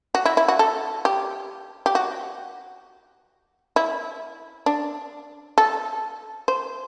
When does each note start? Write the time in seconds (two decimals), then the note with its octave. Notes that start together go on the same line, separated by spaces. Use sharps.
0.15 F#4
0.25 E4
0.37 E4
0.48 F#4
0.59 A4
1.05 G4
1.86 G4
1.95 F#4
3.76 E4
4.66 D4
5.58 A4
6.48 C5